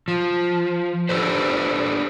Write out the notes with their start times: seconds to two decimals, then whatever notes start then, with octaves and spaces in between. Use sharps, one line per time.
0.08 F3
1.09 D4 G4 A4 B4 C5